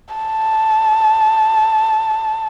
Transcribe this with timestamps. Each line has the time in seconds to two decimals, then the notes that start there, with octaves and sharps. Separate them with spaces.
0.15 A5